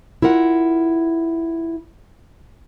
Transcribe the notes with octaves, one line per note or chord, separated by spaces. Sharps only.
E4 F4 A#4 F#5